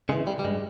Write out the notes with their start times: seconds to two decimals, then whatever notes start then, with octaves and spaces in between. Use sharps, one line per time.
0.09 C#3 G#3
0.12 E3
0.27 G3
0.39 G3
0.44 G2 G#3